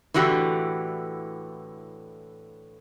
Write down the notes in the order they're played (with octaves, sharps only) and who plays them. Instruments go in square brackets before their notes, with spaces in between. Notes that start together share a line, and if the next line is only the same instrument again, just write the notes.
[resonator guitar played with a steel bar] A2 D3 E3 F#4 G4